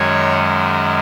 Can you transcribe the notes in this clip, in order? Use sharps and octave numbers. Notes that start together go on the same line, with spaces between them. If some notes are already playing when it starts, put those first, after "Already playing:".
Already playing: F#2 D#3 G#3 C#5